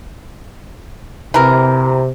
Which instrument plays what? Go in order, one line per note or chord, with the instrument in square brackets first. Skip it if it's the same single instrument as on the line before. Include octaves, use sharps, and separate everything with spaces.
[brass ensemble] C3 [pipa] E3 A#4